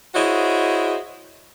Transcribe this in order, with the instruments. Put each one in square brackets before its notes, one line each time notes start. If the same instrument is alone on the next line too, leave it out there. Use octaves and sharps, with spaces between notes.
[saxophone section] E4 F#4 G#4 C5 C#5 D#5